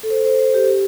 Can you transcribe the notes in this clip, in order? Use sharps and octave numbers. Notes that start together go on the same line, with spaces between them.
A4
C5
C5
C5
G4
G4